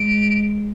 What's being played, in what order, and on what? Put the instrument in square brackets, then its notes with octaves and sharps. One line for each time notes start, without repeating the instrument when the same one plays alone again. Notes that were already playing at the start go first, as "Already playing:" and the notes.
Already playing: [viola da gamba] G#3 [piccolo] D7